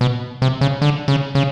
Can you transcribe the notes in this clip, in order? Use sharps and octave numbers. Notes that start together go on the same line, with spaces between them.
B2
C3
C#3
D3
C#3
C#3